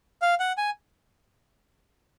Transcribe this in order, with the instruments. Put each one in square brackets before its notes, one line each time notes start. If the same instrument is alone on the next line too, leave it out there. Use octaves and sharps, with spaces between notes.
[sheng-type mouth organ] F5
F#5
G#5